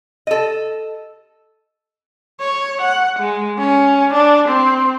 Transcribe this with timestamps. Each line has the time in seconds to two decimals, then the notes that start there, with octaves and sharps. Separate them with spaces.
0.27 A4 D#5
2.40 C#5
2.81 F#5
3.19 G#3
3.58 C#4
4.13 D4
4.48 C4